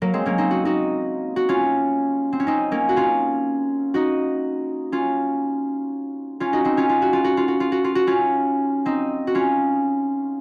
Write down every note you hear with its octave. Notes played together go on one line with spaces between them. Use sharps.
F#3 A#3
G#3 C4
A#3 C#4
C4 D#4
F#4
D#4 F#4
F#4
C#4 F4
C4
C#4
C4 D#4
A#3 C#4
F#4
C#4 F4
D#4 F#4
C#4 F4
C#4 F4
D#4 F#4
C4 D#4
C#4 F4
F4
F#4
F4
F#4
F4
F#4
F4
F#4
F4
F#4
C#4 F4
C4 D#4
F#4
C#4 F4